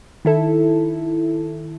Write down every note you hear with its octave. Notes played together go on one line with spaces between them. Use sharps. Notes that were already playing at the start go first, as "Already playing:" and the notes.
D#3 E4 A4